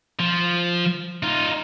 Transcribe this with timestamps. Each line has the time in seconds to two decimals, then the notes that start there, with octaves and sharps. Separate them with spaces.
0.20 F3
1.23 D#4 F4